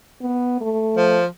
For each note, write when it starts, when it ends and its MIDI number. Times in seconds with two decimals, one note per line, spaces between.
0.21 0.60 59
0.61 1.19 57
0.96 1.25 53